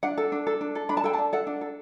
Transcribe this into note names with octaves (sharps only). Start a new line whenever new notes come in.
D4 F#5
A4
D4
A4
D4
A4
D4 B5
A5
A4 G5
A5
D4
A4 F#5
D4
A4